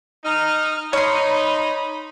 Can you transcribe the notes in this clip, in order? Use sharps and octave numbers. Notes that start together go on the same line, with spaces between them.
D#4 F6
D#4 C#5 B5 C6